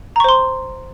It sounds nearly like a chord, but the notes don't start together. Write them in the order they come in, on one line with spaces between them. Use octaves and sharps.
A#5 C#6 C5 C6